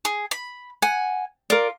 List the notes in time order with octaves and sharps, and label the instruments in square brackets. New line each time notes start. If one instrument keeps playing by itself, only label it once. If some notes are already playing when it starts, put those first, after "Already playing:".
[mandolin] G#4
B5
[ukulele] F#5 [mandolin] G#5
[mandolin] F4 [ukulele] A#4 D5